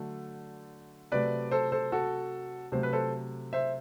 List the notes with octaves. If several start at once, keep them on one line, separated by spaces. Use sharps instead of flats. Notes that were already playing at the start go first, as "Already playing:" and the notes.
Already playing: D3 F#3 A3
C3 F#3 A3 B4 D5
A4 C5
A4 C5
F#4 A4
C3 F#3 A3 C5
B4
A4 C5
C5 E5